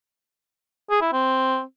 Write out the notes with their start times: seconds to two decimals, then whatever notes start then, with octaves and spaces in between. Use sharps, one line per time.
0.90 G#4
1.01 E4
1.12 C4